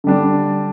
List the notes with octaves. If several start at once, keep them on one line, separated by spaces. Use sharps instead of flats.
D3 G3 D4